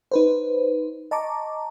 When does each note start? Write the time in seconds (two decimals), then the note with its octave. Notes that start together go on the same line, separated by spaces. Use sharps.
0.11 D#4 B4 C5
1.11 D#5 A5 A#5 C#6 D6